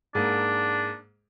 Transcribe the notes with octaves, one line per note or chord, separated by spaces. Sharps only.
G#2 A#3 D4